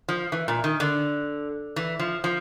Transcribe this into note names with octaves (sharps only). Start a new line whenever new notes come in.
F3
E3
A#2
D#3
D3
E3
F3
F3